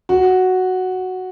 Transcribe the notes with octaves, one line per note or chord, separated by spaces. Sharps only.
F#4